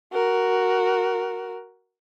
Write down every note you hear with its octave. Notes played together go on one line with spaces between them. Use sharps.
F#4 A#4